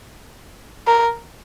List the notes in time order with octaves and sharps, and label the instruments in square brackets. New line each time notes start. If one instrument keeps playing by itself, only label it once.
[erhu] A#4